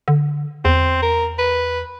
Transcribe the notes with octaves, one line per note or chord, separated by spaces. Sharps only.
D3
E2 C4
A#4
B4